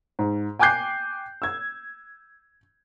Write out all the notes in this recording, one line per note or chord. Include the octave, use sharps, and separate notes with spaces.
G#2
G5 G#5 D6 F#6 G6 C7
E6 G#6